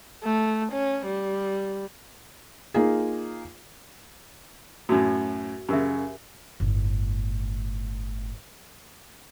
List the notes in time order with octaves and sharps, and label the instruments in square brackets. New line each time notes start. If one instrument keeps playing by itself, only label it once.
[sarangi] A3
C#4
G3
[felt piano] A#3 D#4 F4 G#4
[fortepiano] F#2 A2 [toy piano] F#4
[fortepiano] F#2 C#3 [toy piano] G4 A#4 E5
[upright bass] G1 A2